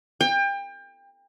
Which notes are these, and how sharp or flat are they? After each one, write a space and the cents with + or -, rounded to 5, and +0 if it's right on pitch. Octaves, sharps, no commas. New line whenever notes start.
G5 +30